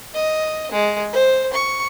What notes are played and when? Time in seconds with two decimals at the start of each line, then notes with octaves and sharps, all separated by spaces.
0.14 D#5
0.71 G#3
1.13 C5
1.53 C#6